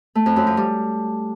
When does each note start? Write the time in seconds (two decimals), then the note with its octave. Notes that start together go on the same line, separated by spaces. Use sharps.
0.15 A3
0.26 F2
0.36 F#2
0.47 F3
0.57 G3